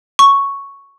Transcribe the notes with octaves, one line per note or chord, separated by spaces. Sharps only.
C#6